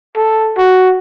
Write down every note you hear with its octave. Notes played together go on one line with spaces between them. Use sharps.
A4
F#4